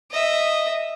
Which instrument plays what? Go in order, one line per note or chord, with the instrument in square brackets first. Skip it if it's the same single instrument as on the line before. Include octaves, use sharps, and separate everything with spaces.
[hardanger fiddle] D#5 E5